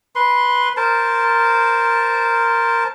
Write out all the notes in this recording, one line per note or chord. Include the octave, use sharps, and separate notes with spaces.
B4 C6
A#4 C5 A5